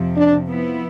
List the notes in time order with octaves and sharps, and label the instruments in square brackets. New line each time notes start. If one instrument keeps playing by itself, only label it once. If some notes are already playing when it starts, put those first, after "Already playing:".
Already playing: [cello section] F2 C3 F3
[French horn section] D4
[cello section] F3 B3 E4